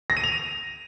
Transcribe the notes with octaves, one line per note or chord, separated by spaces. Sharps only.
A#6
D#7
F7